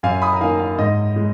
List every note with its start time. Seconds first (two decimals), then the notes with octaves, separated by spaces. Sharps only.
0.03 F#2 F5 G#5
0.22 B5 D#6
0.33 A#5
0.41 D#3 A#3 F5 G#5
0.59 F5
0.78 G#2 D#5
1.16 G#3